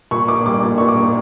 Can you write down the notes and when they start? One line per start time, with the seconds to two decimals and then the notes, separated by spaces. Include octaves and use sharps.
0.11 A#2 C#6
0.28 A#3 D6
0.46 G3 D6
0.63 A#2
0.78 A#2 C#6
0.89 D6
0.96 A#3